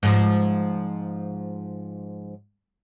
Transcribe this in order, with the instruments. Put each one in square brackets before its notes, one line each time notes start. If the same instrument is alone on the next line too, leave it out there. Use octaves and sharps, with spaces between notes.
[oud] G#2 F3